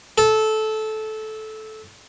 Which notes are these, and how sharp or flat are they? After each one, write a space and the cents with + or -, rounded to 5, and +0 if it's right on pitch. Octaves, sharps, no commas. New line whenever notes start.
A4 -15